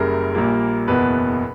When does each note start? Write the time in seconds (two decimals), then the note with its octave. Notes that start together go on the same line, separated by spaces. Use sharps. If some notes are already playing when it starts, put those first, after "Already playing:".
Already playing: F#1 F#2 C#3 G3 A#4
0.35 A#1 A#2 G3 A#3
0.88 F#1 E2 B2 B4